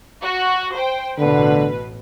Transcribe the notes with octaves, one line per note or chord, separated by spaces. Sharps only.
F#4
C5 G5
A1 B2 D3 B4